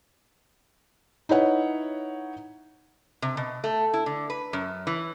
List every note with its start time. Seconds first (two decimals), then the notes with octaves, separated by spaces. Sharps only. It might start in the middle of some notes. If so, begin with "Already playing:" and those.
1.29 D#4 E4 B4 C#5 F#5
3.22 C3
3.37 B2
3.64 A3
3.93 E4
4.06 D3
4.30 B4
4.53 F#2
4.87 E3